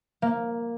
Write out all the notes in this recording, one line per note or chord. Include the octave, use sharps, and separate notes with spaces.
A#3